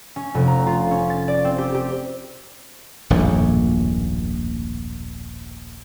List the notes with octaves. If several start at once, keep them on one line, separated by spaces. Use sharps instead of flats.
C#4
F1
A#5
F4
C#4
A6
D5
C4
G4
G4
D#1 A#1 F#2 A2